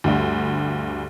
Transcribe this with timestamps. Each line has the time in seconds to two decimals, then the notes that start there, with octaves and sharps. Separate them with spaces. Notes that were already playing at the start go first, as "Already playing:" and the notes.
0.04 D2 G2